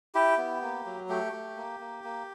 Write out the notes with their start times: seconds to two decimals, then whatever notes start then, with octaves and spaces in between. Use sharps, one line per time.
0.15 E4 G4
0.37 B3
0.62 A#3
0.86 F#3
1.09 A3 G4
1.32 A3
1.57 A#3
1.80 A#3
2.04 A#3